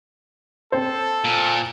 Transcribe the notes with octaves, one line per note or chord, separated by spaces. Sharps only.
C4 A4 C5
A#2